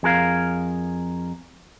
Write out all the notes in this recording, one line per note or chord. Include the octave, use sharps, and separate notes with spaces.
F2 G#4 A#4 F5